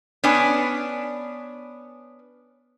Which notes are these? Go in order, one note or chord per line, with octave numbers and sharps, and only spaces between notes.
B3 C#4 D4 G#5